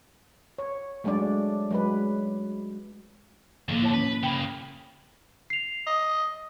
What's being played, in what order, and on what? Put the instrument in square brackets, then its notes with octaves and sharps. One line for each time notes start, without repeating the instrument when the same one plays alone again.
[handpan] C#5
F#3 G#3 A3 D4 D5
F#3 G#3 B4
[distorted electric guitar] D#2 D3 [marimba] A2 F3 A#3
[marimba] E4 C#5 A5
[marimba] C#4 [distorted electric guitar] B4
[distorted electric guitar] C#3 A#3 [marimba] G5 B5
[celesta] C7 F7
[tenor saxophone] D#5